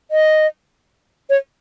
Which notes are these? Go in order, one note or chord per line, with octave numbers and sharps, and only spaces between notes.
D#5
C#5